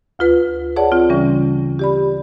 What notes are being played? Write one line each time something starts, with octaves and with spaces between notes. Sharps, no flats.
D2 F4 B4
G#4 C#5 D5 F#5 A5
C4 F4
C#3 E3 G3 C#4
G4 D5 B5